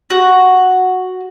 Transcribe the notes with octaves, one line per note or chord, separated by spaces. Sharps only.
F#4